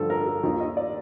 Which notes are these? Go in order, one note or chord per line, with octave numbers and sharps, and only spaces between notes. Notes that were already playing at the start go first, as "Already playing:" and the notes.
Already playing: G2 D3 F3 A4
A#4
A4
D#2 D#3 F4
D#5
D5